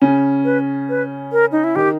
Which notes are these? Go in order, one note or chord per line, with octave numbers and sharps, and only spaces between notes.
C#3 C#4 G#5
B4
B4
A#4
D#4
E4
D#3 D#4 G4